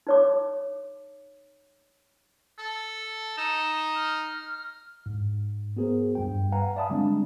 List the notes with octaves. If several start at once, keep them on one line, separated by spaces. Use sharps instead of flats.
D#4 C#5 D6
A4
D#4 E7
F6
G#2
B3 F#4 G#4 A#4 C5
G2 G3 G5
B4 F5 F#5 G#5 A#5
D5 E5 F5 A5 B5 D#6
D3 G3 G#3 C4 D4